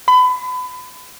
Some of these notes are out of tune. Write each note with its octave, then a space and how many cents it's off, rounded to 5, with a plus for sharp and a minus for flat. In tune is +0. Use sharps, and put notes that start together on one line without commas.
B5 +30